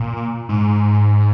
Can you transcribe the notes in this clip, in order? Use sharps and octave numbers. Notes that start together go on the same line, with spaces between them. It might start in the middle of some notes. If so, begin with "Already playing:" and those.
Already playing: A#2
G#2